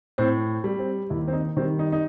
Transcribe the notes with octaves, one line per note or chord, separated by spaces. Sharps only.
A2 C4
G3
C4
D#2 E4
C4
D#4
D#3 G3 C4
D#4
D#4